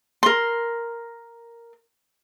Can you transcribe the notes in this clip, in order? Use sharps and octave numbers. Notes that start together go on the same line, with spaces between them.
A#4 C6